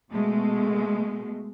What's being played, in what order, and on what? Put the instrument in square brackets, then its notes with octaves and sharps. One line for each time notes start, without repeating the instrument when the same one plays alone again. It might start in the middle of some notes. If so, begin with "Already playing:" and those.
[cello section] B2 G#3 A3